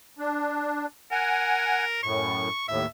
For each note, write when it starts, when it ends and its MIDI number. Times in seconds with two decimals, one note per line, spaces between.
0.19 0.86 62
1.12 1.99 70
1.12 1.85 78
1.12 1.85 80
2.03 2.49 42
2.03 2.49 45
2.03 2.67 85
2.68 2.86 39
2.68 2.86 45
2.68 2.86 76